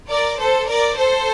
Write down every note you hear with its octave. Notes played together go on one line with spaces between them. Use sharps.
A#4 D5
A4 C5
A#4 D5
A4 C5